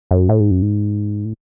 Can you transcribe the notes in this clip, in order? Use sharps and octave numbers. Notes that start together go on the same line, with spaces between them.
F#2
A2
G#2
F#2
G#2
A2